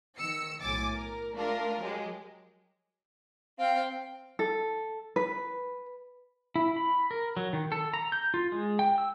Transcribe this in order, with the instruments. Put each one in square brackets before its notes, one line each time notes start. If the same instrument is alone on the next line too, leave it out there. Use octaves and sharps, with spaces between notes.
[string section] D#3 E6 C#7
B1 A2 G#5 D6 A6
A#4
A3 D4 F4 A#4
F#3 G#3 G4
[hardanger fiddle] C4 G5 [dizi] F5
[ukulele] A4
B4
[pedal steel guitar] E4
B5
A#4
F#3
D#3
A4
A#5
G6
F4
G#3
G5
E6